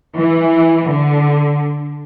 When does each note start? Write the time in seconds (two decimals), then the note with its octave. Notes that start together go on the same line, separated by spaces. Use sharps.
0.17 E3
0.90 D3